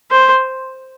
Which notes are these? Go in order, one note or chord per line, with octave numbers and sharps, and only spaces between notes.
C5